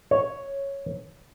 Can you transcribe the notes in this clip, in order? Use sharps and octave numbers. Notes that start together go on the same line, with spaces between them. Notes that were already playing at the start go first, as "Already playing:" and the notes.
C#5